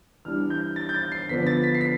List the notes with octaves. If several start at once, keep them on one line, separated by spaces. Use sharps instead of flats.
E3 G3 D4 F6
G6
A6
G6
A6
C7
D3 F3 B3 D4 B6
A6
B6
C7
B6